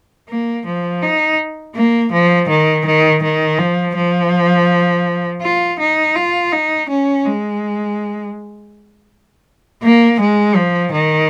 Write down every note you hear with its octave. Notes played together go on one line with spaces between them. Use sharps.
A#3
F3
D#4
A#3
F3
D#3
D#3
D#3
F3
F3
F4
D#4
F4
D#4
C#4
G#3
A#3
G#3
F3
D#3